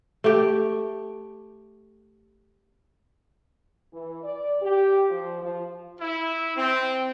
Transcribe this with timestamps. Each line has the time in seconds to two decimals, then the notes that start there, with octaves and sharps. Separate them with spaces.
0.24 A3 G4
3.93 E3
4.24 D5
4.62 G4
5.10 F3
5.42 F3
5.99 E4
6.56 C4